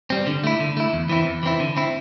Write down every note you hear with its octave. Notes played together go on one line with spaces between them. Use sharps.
G3 C4
D3
A3 E4
D3
A3 E4
E2
E3 C4 E4
E2
E3 C4 E4
D3
C4 E4